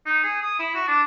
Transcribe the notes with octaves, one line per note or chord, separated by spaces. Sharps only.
D#4
G#4
D#6
E4
F#4
D4